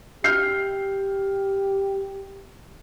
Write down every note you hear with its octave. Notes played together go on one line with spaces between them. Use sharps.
G4 F6 G6 C7